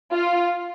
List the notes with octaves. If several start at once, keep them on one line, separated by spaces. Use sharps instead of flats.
F4